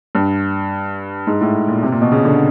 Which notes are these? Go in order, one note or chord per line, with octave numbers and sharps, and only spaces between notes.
G2
G#2
A2
A#2
C3
A#2
B2
C#3
D3